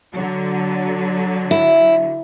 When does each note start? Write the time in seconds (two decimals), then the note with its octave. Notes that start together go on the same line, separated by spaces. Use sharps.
0.12 D3 F#3
1.51 E4